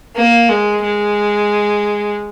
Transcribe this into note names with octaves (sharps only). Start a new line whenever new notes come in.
A#3
G#3
G#3